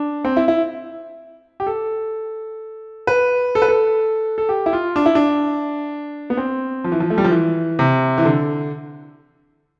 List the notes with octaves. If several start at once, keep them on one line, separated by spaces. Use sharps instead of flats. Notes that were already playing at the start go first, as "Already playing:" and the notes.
Already playing: D4
C4
E4
E4
G4
A4
B4
A4
B4
A4
A4
G4
E4
F4
D4
E4
D4
B3
C4
F3
E3
F3
A3
G3
F3
E3
C3
E3
D3